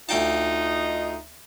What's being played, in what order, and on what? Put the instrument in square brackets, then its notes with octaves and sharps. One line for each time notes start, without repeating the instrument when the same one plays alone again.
[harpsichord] D2 G5 A5 [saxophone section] D#4 F4